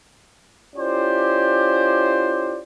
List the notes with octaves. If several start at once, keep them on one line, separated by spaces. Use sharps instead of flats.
C#4 E4 F4 G4 C5 D5